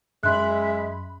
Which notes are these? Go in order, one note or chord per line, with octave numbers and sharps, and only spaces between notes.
F#2 G#3 E5 B5 C6 F#6